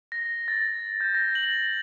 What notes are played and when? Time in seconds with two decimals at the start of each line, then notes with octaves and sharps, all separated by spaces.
0.12 A#6
0.48 A6
1.01 G6
1.15 A#6
1.35 F#7